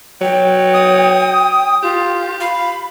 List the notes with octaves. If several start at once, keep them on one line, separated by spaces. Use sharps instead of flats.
F#3 G5
D#6
F4 G4
F5 B5